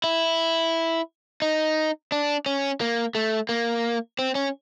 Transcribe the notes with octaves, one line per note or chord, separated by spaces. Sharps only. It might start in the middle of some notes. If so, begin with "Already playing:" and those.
E4
D#4
D4
C#4
A#3
A3
A#3
C4
C#4